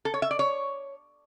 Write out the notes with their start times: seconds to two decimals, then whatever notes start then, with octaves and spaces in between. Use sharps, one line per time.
0.05 A4
0.14 C#5
0.22 E5
0.31 D5
0.39 C#5